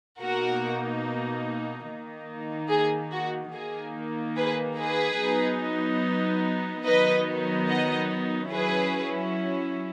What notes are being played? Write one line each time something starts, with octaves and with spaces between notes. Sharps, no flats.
B2 A#3 D#4 F#4 A#4
D#3 A#3 D#4
G#4
F#4
D#3 A#3 D#4 G#4
G#4 B4
G#4 B4
F#3 B3 D#4
D#3 F#3 B3 D#4 B4 D#5
D#5 F#5
F#3 C#4 E4 G#4 B4